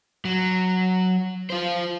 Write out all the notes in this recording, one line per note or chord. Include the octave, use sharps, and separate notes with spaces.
F#3
F4 C5